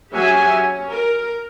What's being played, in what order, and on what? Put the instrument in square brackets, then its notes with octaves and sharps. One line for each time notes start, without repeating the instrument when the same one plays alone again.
[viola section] F#3 C#4 G4 G#4 E5 G#5
C#4
A#4